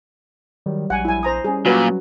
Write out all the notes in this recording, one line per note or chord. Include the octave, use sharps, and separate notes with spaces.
D#3 F#3 G3
A#1 F#5 G#5
E4 G#5
C5 A#5 D#6
G3 C#4 G#4
A#2 F#3 F#4 B4